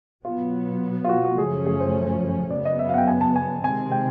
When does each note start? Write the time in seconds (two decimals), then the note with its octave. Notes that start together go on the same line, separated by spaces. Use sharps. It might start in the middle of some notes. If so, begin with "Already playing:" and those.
0.25 B2 F#3 B3 F4
1.04 F4
1.09 F#4
1.24 F#4
1.38 F#2 C#3 F3 A3 C#4 G#4
1.66 G#4
1.80 C5
2.50 F#2 C#3 F#3 B3 D5
2.65 D#5
2.79 E5
2.89 F5
2.94 F#5
2.98 G5
3.08 G#5
3.21 A5
3.36 G#5
3.64 C3 D#3 G#3 C4 G#5
3.92 G5